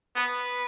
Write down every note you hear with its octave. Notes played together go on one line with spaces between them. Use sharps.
B3 B4